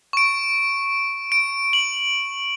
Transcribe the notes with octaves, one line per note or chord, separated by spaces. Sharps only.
C#6 D7
D7
F#7